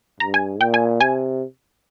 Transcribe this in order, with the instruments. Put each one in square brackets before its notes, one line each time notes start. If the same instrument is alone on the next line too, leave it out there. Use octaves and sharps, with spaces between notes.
[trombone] G2 [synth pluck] A#5
[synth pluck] G#5
[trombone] A#2 [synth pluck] G5
[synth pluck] G#5
[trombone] C3 [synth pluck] G#5